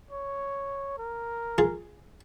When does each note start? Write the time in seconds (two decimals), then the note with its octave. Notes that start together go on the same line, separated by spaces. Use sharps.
0.11 C#5
0.98 A#4
1.58 F4 G#4